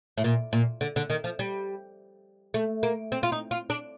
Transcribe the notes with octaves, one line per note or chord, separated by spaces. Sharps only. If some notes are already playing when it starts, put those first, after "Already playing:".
A2
A#2
A#2
D3
D3
D#3
F3
G3
A3
A#3
C4
F4
D#4
F4
D4